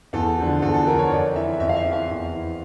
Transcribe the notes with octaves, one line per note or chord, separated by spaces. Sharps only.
E2 A4
D3 F3
E2 A4
A4
D3 F3 A#4
C#5
F2 D5
E3 E5
F2 E5
F5
E5
E3
F5
E2
E3